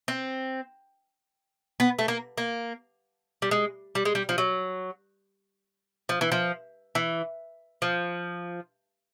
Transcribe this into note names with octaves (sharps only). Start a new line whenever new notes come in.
C4
B3
A3
A#3
A#3
G3
G#3
G3
G#3
G3
F3
F#3
F3
E3
F3
E3
F3